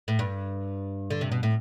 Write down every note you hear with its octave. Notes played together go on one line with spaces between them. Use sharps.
A2
G2
D3
C3
B2
A2